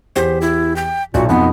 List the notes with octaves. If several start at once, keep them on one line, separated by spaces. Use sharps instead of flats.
E2 G4 C5 B6
E4
G5
B1 A#2 F#4
F2 B2 B3 D#4